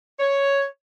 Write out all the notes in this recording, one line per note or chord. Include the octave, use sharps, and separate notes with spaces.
C#5